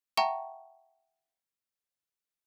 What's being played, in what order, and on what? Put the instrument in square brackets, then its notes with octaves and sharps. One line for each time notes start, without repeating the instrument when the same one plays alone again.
[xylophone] E5 F#5 G5 A5 A#5 C#6